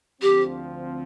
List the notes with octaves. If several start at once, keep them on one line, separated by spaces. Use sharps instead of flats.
D2 D3 F3 C4 G4